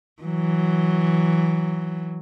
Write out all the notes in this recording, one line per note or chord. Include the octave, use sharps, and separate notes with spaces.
E3 F#3